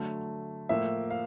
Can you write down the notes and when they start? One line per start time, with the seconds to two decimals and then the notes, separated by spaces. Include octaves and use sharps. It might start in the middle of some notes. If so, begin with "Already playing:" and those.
Already playing: D3 F#3 A3
0.69 A2 F3 A#3 E5
1.10 F5